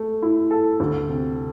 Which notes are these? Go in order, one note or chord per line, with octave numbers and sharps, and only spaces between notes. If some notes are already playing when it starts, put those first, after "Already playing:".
Already playing: A3
E4
A4
D2
C3